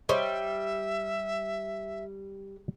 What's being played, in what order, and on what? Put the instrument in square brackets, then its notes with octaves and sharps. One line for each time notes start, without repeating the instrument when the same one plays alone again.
[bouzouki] G3 [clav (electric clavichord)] C5 C#5 D#5 [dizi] E5